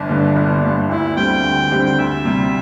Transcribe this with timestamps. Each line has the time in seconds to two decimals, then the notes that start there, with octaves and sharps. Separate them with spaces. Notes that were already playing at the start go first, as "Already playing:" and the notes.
Already playing: G1 D4
0.09 G2 D3
0.36 G1
0.62 G2 D3
0.89 D2 E4
1.17 D3 G3 C4 G4 G5
1.44 D2
1.71 D3 G3 C4 G4
1.86 G5
1.98 D2 E5
2.25 C3 G3